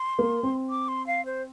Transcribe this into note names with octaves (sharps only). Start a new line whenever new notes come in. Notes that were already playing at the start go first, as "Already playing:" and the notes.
Already playing: C6
A#3
C4
D6
C6
F5
C5